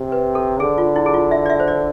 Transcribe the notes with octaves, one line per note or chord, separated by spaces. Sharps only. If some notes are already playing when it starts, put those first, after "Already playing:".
Already playing: C3
B4
A4
D3 G#4
F4
E4
G#4
F4
E5
D5
E5
C5
D5